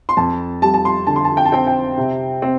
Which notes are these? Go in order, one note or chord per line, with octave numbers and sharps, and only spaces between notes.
C6
F2 A5
G3 A5
A5
C6
D3 A5
C6
A5
G5
A5
C4 G5
G5
C3
C4